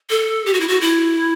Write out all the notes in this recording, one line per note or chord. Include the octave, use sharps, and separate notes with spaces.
A4
G4
F#4
E4
F#4
E4